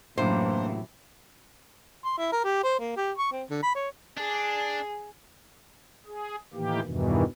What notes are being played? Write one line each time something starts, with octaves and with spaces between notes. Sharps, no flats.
F#2 A2 C3 E3 A#3 D4 C5
C6
E4
A#4
G4
C5
A#3
G4
C#6
C4
D3
B5
C#5
D4 G#4
G#4
A2 D#3 E3 A#3 G4
E2 G2 B2 D#3 E3